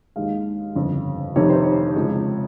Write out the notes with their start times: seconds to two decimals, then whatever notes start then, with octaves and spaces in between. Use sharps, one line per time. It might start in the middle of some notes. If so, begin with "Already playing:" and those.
0.16 D#2 D#3 G#3 F5
0.75 G1 F2 C#3
1.36 F1 F2 C3 D#3 C#5
1.50 C5
1.63 C#5
1.96 F2 C#3 F3 G#3